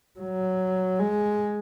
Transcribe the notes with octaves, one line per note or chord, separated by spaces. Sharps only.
F#3
G#3